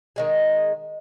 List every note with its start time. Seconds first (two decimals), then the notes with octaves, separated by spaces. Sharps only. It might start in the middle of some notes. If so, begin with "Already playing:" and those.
0.16 D#3 G#3 G#4